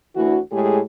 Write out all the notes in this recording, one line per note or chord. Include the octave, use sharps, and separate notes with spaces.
D2 E3 F#4
A2 G#3 G4 G#4